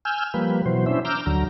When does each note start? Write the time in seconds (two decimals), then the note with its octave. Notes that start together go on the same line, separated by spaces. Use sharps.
0.05 G#5 E6 F6 G6
0.34 F3 G3 A#3 B4
0.66 B2 E3 F#3 C5
0.86 C#4 D4 E4 C5 E5
1.05 A#5 D6 E6 F6 G6
1.26 D2 D3 F#3 A#5